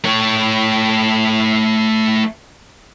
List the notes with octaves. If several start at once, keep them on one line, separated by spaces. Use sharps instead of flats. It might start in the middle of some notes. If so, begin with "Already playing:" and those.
A3 C#5